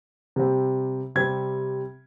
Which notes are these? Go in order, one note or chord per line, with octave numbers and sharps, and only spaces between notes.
C3 G3 C4
C3 G3 C4 G#6